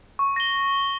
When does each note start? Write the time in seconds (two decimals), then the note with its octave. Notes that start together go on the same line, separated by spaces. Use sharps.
0.19 C#6
0.36 A#6 G7